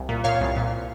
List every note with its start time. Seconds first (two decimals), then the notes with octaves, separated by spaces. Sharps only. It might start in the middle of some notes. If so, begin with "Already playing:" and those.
Already playing: C2
0.09 A#2
0.24 A#2 C#5 F5
0.41 C2
0.57 A#2